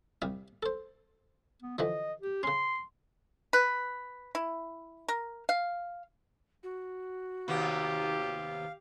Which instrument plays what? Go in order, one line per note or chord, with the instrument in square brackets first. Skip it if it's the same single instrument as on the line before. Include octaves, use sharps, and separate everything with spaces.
[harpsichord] C2 G3 F5
A4 C5
[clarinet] B3
[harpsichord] D3 E3 F3 [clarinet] D#5
[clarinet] G4
[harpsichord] C#3 C#4 [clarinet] C6
[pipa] B4
E4
A#4
F5
[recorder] F#4
[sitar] D#2 C3 B3 [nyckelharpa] G4 [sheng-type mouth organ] F5